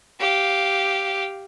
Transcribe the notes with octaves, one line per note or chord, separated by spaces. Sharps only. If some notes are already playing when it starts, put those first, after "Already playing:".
G4 F5